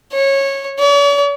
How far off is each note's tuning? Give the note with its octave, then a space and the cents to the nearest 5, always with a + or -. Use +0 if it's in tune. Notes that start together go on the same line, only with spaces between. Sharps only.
C#5 -15
C#5 +45